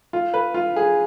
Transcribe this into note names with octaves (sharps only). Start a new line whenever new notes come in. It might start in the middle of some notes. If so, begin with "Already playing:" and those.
F4
B4
F4
G#4